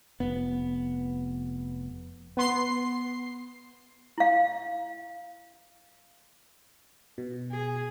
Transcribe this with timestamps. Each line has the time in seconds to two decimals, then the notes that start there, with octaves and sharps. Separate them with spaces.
0.20 F1 B3
2.37 B3 C6 C7
4.18 E4 F5
7.18 B2
7.51 G#4